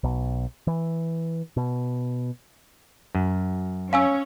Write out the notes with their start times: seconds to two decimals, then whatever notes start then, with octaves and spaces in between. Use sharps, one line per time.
0.03 B1
0.67 E3
1.57 B2
3.15 F#2
3.93 C#4 F5 G#5 E6